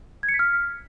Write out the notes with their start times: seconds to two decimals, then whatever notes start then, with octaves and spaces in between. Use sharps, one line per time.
0.23 G#6
0.29 C#7
0.34 B6
0.39 F6